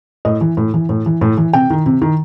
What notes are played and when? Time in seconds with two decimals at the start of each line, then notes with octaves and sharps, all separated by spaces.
0.25 A2 D#5
0.41 E3
0.57 A2
0.74 E3
0.89 A2
1.06 E3
1.21 A2
1.37 E3
1.53 C3 G5
1.70 D#3
1.86 C3
2.02 D#3